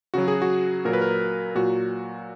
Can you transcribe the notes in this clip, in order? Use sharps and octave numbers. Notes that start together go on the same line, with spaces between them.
C#3 F#3 F#4
G#4
F#4
A#2 F#3 A#4
B4
A#4
A#2 F#3 F#4